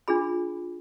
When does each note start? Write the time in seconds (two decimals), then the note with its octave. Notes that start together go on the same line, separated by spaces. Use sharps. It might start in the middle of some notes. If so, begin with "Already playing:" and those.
0.08 D4 F4 G#4 B5